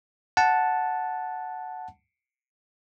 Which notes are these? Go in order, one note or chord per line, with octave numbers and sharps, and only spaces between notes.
F#5 A5